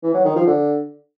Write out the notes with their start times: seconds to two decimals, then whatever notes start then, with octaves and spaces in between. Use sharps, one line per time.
0.03 E3
0.14 F#3
0.25 D#3
0.36 F3
0.47 D3